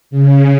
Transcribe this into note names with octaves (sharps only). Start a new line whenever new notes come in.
C#3